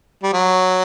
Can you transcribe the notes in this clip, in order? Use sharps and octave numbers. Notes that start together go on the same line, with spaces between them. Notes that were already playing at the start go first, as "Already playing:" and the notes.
G3
F#3